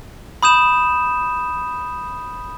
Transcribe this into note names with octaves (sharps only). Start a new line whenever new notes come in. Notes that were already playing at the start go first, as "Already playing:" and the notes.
B5 D#6 G6 E7